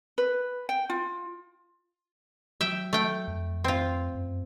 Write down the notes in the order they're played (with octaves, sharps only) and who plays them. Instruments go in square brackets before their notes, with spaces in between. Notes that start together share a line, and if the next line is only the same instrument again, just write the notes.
[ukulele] B4
G5
F4
[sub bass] F#3 [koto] E5 G5
[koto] A3 G5
[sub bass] F2
[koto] C4 F4
[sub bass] F#2